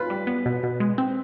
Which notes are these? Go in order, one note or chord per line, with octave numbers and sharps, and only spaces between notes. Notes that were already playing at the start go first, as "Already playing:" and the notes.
Already playing: F4 B4
G3
B3
B2
B2
G#3
C4